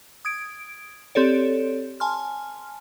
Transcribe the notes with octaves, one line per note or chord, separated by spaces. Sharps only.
D#6 G#6 D7
C4 G4 A4 C#5 D5
G#5 A5 C6 F6